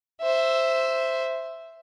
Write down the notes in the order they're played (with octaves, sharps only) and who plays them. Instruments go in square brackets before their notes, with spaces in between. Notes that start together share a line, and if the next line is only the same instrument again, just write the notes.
[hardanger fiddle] C5 E5